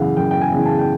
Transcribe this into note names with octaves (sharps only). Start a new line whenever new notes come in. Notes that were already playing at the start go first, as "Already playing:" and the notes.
Already playing: F#2 C#3 E3 F5 F#5
F#2 G5
G5
G#5
C#3 E3
A5
G5